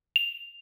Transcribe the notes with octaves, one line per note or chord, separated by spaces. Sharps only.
F7